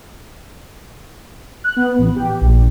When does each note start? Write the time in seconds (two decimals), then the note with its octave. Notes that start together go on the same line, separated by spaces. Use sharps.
1.64 F#6
1.77 B3
1.99 A1
2.16 G4
2.41 A#1